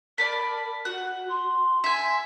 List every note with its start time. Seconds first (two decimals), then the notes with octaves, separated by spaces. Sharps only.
0.18 A#4 D5 A5 B5
0.85 F#4 F#5
1.29 C6
1.84 E5 G#5